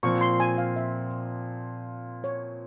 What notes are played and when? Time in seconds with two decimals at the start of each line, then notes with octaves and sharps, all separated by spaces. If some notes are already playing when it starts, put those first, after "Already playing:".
0.03 A#2 F3 C4 C#6
0.21 C6
0.40 G#5
0.58 F5
0.76 E5
2.24 C#5